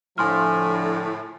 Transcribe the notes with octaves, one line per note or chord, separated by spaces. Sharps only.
A2 D3 F3 G#5 C6 F6